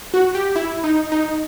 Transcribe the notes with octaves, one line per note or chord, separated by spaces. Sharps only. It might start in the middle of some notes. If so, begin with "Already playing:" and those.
F#4
G4
E4
D#4
D#4